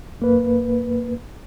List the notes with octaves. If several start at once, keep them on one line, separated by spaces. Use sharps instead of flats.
F#2 A#3 B4